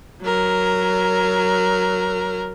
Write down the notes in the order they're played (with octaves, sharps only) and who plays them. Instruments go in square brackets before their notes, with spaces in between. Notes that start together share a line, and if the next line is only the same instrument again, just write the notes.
[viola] F#3 A#4